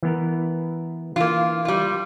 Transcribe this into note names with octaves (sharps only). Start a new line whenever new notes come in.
E3 B3 A#4
E3 A#3 F4
G3 F4